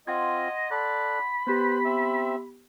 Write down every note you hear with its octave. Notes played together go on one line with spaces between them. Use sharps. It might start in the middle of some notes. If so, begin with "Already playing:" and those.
C4 F4 D#5 F#5 C6 G#6
A4 D5 B5 F#6
B3 G4 B4 C5
C4 E5